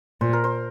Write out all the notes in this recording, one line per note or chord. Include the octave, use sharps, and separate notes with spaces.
A#2 C5
A#4
C5